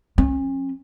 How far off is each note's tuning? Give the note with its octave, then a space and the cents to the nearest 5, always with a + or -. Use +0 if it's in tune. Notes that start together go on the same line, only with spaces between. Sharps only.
F3 +30 C#4 -40